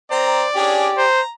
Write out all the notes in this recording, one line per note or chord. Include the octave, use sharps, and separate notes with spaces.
C4 C5 D5 A#5
C#4 D4 G4 G#4
C5 A#5